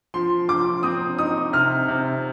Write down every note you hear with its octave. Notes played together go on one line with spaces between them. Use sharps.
F3 C6
F3 D6
C4 D#6
D#4 D#6
C3 F6
C3